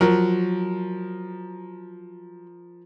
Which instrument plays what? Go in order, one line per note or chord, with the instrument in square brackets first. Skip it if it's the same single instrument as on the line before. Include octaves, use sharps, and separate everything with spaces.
[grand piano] F3 A#4 [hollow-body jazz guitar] F#3